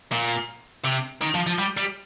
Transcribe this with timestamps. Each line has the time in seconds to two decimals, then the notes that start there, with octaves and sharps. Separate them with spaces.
0.12 A#2
0.85 C3
1.22 D#3
1.35 F3
1.47 F3
1.59 G3
1.77 G3